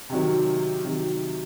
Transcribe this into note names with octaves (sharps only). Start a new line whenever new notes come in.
C3 D#3 F#3
C3 D#3 F#3